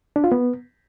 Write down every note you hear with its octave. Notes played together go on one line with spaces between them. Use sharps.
D4
F4
B3